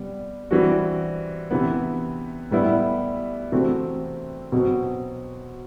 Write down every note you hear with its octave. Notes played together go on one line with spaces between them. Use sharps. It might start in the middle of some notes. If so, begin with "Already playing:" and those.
Already playing: C3 G3 B3
E3 G3 C4 F#4
C3 E3 B3
A2 G3 B3 E4
C3 E3 A3 C4 F#4
B2 F#3 C4 F#4